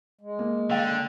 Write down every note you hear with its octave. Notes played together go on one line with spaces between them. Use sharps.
G#3
A#3
D3 F5 G5